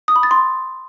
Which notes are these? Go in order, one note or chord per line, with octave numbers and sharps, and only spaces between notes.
D#6
B5
A6
C6